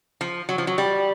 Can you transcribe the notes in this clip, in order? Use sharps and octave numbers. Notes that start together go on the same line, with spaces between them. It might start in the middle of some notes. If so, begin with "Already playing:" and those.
F3
F#3
F3
F#3
G3